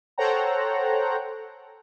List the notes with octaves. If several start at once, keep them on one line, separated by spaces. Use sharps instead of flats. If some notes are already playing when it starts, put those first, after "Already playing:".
A4 C5 C#5 F#5 G5 A#5